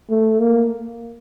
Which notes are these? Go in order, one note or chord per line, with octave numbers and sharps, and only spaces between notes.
A3
A#3